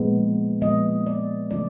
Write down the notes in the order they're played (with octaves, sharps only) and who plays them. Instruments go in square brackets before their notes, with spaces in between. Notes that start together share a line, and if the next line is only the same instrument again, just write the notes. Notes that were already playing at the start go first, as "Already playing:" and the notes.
Already playing: [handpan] A#2 F3 G#3 B3
A#2 F3 G#3 B3 D#5
D5
C#3 F3 A3 C#4 D5